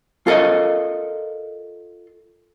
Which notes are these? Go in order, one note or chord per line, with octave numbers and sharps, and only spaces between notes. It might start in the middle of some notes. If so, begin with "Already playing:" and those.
F4 A4 A#4 D#5